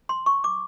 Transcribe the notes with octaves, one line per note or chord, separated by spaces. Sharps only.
C6
C#6
D6